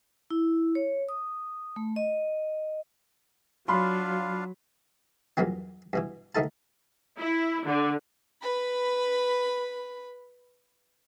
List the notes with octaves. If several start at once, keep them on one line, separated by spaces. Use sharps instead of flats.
E4
C#5
D#6
A3
D#5
F#3 D4 F4 F5 B5 C6
E2 G2 A#2 F#3 B3 C4
G2 B2 E3
D2 D#3 A3 D#4 A4 A5
E4
D3
B4 B5